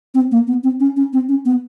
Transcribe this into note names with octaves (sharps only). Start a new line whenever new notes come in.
C4
A#3
B3
C4
C#4
C#4
C4
C#4
B3